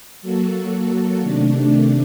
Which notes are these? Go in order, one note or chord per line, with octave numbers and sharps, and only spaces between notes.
F#3 A#3 F#4 A4
C3 D#3 A3 D4